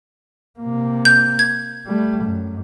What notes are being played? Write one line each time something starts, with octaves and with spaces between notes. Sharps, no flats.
C3 A#3
G6
G#6
G3 A3
F#2